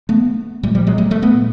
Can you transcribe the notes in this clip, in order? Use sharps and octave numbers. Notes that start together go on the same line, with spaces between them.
A3 B3
A#2 G3 A3
F3 G3
F#3 G#3
G3 A3
G3 A3
A3 B3
A#2